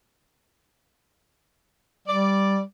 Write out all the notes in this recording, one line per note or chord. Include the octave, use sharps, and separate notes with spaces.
G3 D5